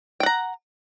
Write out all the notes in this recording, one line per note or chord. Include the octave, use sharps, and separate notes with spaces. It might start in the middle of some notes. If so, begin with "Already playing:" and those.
F#5 G5 A#5